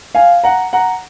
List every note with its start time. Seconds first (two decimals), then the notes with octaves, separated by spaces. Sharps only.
0.15 F5 G#5
0.44 F#5 A#5
0.73 F#5 A#5